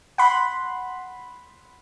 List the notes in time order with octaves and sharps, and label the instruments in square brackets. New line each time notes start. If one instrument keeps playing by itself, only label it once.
[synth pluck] F#5 B5 C6